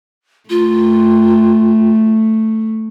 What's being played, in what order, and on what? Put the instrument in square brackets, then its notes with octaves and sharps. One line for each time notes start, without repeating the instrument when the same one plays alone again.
[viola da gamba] A3 [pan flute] F4